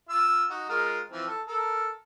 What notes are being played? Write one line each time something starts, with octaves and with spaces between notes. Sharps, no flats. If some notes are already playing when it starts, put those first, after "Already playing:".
F4 E6
D#4 F#4
G#3 F4 A#4
E3 F3 C4
A4
A4 A#4